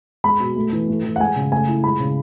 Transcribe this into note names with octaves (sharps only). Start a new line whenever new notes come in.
G#3 B5
B2
A3
E3
A3
E3
F#5
G#3 G#5
C#3
A3 G#5
E4
G#3 B5
C#3